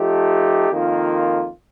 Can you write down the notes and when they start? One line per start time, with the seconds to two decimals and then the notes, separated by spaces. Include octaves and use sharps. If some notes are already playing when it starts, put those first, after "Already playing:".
Already playing: F3 A3 D#4 G4
0.69 F2 D#3 A#3 F4